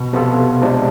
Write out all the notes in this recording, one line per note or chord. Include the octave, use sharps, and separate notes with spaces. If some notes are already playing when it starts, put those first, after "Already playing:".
Already playing: B2
C3 F3 B3 F4 A4
C3 F3 G#3 D4